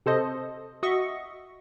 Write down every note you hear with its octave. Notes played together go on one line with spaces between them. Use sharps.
C3 A4 C5 D#5
F#4 D#5 E5 C#6